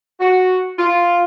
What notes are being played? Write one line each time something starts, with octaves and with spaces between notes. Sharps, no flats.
F#4
F4